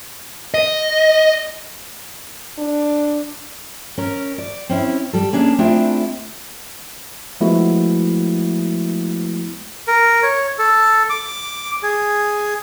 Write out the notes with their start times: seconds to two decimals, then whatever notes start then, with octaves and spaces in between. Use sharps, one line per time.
0.54 D#5
2.58 D4
3.98 C#4 A#4
4.38 D5
4.69 C4 C#4 E4
5.13 G3 A4
5.33 A#3 C#4 D4 G#4
5.58 A3 C4 D4 E4 F4 G#4
7.41 F3 G#3 A3 B3 E4 F#4
9.88 A#4
10.23 C#5
10.58 A4
11.10 D6
11.83 G#4